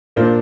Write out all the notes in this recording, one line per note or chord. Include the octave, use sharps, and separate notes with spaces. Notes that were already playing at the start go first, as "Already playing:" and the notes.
A#2 A#3 D4 F4 C5